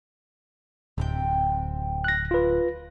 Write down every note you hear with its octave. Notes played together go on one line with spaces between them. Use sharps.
D1 C3 C4 G5
F#6 A#6
F4 B4